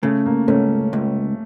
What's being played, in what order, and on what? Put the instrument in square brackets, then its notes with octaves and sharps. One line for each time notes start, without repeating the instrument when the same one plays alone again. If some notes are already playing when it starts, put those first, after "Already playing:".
[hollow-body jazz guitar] C#3 [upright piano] A3
[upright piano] A#3
[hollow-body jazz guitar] C#2 [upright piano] A3 C#4
[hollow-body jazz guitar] C#2